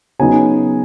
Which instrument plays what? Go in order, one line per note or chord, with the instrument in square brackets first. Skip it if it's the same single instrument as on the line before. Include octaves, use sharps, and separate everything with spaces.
[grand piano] C#3 F#3 B3 D#4 G#5